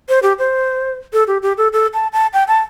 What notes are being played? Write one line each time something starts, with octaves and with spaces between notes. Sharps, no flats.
C5
G4
C5
A4
G4
G4
A4
A4
A5
A5
G5
A5